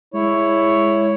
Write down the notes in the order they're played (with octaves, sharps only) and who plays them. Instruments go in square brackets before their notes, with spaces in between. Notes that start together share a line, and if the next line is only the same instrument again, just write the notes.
[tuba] G#3 [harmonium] E4 C#5